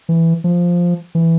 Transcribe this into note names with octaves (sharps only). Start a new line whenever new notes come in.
E3
F3
E3